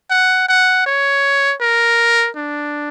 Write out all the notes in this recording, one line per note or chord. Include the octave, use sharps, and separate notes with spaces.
F#5
F#5
C#5
A#4
D4